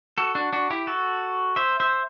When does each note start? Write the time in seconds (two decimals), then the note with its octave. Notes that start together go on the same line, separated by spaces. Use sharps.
0.18 F#4 A4
0.35 D4 F#4
0.53 D4 F#4
0.70 E4 G4
0.87 F#4 A4
1.56 C5 E5
1.80 C5 E5